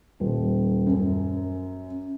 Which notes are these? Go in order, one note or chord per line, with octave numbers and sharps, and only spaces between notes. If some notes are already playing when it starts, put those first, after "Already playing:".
D#1
F#2